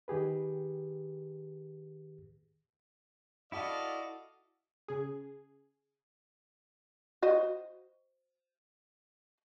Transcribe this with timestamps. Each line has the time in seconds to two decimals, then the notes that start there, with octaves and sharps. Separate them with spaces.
0.08 D#3 G4 G#4 B4
3.52 E4 F#4 A4 D5 D#5 F5
4.88 C#3 G#4
7.22 F#4 C5 D#5